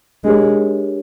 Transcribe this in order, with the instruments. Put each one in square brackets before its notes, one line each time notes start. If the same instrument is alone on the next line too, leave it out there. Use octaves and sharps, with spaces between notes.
[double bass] G#3 [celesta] D4 G4 A#4 C#5